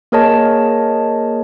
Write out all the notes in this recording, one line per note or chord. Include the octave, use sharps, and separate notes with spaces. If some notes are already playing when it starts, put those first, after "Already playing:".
A#3 G#4 A#4 C#5 D#5 A5